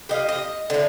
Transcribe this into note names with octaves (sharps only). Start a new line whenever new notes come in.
G4 D#5 F5
D#5
A2 D3